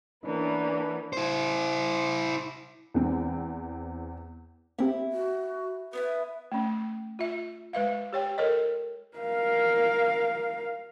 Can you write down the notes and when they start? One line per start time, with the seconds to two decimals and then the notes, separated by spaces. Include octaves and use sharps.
0.24 E3 A#3 B3 C#4 D4 B4
1.13 E4 C5
2.94 E2 C4
4.79 A#3 C4 E4 G4
5.13 F#4
5.93 B3 D4 E4 B4
6.52 A3 C#4
7.19 F4 E5
7.73 G#3 B4 E5 F5
8.13 G4 C#5 G5
8.38 A4 A#4 C#5 D#5
9.17 A#4 F5